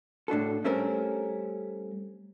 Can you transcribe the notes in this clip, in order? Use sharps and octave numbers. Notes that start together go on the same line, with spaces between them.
A2 D4 F#4 A4
G3 A3 C4 C#4 A#4